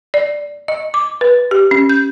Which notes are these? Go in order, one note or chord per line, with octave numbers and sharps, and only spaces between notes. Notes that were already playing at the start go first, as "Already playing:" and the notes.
D5
D#5
D6
B4
G4
C#4
G6